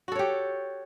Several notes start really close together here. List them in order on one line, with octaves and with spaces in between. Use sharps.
F#4 A4 C#5 G4